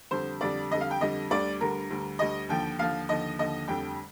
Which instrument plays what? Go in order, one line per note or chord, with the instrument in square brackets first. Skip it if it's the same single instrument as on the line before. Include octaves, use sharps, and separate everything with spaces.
[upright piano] F2 D3 G3 C5
F2 D3 G3 D5
F2 D3 G3 D#5
F5
G5
F2 D3 G3 D#5
D2 D3 G3 D5
D2 D3 G3 A#4
D2 D3 G3
D2 D3 G3 D#5
D#2 D3 F3 G5
D#2 D3 F3 F5
D#2 D3 F3 D#5
D#2 D3 F3 D#5
F1 F2 D3 G3 G5